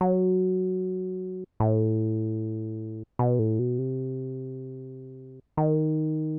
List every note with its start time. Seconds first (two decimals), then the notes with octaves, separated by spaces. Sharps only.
0.01 F#3
1.60 A2
3.19 B2
3.39 A2
3.59 B2
3.79 C3
5.57 D#3